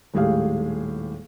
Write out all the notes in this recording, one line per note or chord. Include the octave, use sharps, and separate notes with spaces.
D#1 A2 G#3 G4 G#4 F5